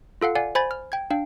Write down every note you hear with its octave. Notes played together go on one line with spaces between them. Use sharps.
F4 A4 F5 F#5
D5 F5 F#5 G#5
C5 G#5 B5 G#6 A6
F6
G5 G#6
D4 F5 G5